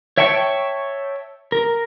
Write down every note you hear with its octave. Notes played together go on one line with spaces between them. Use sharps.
C#5 E5 G5 A5 C#6
A#4